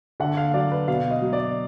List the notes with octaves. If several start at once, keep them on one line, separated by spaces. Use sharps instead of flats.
D3 F#5
F5
F#3 D5
B4
B2 F5
D#5
F#3
D5